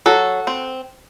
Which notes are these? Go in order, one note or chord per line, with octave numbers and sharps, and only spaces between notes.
F#3 F#4 A4
C4